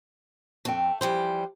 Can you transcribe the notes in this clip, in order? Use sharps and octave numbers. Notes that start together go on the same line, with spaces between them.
F2 A3 C4 G5
E3 F3 G3 C5